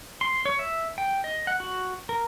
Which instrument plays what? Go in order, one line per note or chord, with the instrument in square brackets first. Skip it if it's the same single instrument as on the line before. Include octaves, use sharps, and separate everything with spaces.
[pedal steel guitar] C6
C#5
E5
G5
D#5
F#5
F#4
A#4